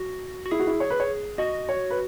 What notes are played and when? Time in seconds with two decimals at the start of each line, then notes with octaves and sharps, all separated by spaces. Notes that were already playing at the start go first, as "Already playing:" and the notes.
Already playing: F#4
0.46 F#4
0.51 E4 G#4
0.60 F#4
0.67 E4
0.80 C#5
0.90 B4
1.00 C#5
1.38 F#4 D#5
1.69 C#5
1.90 B4